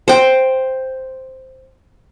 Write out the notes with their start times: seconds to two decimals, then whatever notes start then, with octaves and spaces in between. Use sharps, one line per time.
0.08 C5 G5